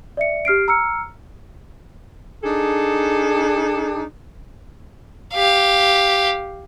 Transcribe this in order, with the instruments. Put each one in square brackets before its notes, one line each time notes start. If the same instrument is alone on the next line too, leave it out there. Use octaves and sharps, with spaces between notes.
[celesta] D5 E5 C#7
G4 F6 C7 D7
A#5 E6 F6 C#7
[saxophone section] D4 D#4 G#4 A4
[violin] G4 F5